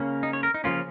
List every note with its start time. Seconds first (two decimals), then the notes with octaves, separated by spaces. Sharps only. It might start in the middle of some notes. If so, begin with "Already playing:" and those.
Already playing: C#3 A#3 C#4
0.23 D#4
0.33 C#5
0.43 A#4
0.54 D#4
0.64 C#3 F3 A#3 C#4 F4